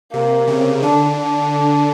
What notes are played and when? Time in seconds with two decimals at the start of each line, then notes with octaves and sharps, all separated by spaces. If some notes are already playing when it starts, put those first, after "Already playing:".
0.13 C3 A#3
0.48 C#3
0.82 D3 D4
1.17 D4